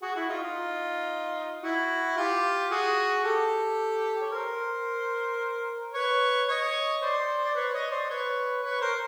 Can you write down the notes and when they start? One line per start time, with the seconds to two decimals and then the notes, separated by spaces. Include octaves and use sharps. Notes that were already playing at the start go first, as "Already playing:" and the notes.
0.02 F#4 G#4
0.15 E4 F#4
0.29 D#4 F4
0.42 D#4 F4
1.63 E4 F#4
2.17 F4 G4
2.71 F#4 G#4
3.24 G4 A4
4.22 C#5
4.32 A#4 C5
5.94 B4 C#5
6.48 C#5 D#5
7.02 C5 D5
7.45 D5
7.55 B4 C#5
7.73 C#5 D#5
7.91 C5 D5
8.10 B4 C#5
8.63 B4 C#5
8.81 A#4 C5